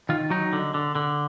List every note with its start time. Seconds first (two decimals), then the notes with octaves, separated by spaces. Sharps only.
0.09 D#3 F4
0.30 F#3 D#4
0.53 D3
0.74 D3
0.95 D3